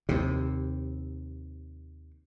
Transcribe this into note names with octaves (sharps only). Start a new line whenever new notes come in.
D#2 C3